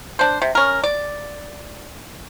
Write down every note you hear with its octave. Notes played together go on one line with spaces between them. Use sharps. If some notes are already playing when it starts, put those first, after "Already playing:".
D4 C5
C3
C#4 A#4
D5